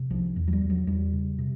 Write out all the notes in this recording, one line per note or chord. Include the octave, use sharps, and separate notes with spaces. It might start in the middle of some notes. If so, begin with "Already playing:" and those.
Already playing: C3
C2 F3
E2
F#3
G3
E2
F#3
E2 G3
C#3
C3